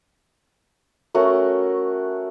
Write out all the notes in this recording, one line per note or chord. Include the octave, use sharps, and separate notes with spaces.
A3 C#4 F#4 A#4